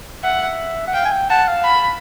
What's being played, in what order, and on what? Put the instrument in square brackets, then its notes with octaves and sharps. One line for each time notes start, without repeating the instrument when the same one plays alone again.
[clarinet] E5 [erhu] F#5
[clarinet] F#5
[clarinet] F5 [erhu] G5
[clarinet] G#5
G5
[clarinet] F#5 [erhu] A5
[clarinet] F5
[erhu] B5